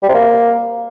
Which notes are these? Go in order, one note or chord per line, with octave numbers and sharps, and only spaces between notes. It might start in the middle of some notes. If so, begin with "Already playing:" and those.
G3
C3
A#3